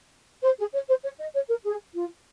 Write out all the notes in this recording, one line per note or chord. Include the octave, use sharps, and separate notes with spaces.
C5
G#4
C#5
C5
C#5
D#5
C#5
A#4
G#4
F4